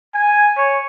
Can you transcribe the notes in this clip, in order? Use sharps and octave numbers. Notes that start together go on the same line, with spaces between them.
G#5
C#5